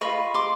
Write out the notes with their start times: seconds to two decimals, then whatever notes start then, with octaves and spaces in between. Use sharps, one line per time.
0.01 F4 A#4 D#5 B5 C#6
0.34 C6 D6